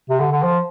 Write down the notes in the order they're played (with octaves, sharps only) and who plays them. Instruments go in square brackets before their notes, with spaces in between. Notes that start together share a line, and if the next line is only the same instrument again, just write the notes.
[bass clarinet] C3
D3
D3
F3